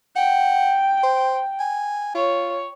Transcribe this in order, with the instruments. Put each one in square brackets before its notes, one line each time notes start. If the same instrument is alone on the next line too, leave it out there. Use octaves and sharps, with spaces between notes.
[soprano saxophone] F#5 [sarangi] G5
[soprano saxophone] C5
G#5
[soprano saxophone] F4 [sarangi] C#5